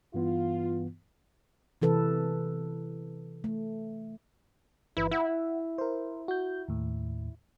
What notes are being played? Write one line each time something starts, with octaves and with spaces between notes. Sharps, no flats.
G2 E3 B3 F4
C3 E3 A4 B4
A3
G1 E3 E4 B4
E4 E5 F#5
A#4 C5
F#4 G6
D#2 A2